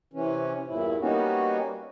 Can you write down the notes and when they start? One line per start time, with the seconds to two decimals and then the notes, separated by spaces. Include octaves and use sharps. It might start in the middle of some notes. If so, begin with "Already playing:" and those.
0.13 C3 E3 C#4
0.67 E2 G2 A#2 E4
1.00 G3 A#3 B3 C#4 D#4 F#4